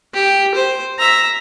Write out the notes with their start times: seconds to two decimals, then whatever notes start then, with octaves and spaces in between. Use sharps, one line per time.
0.13 G4
0.55 C5
0.99 E5 A#5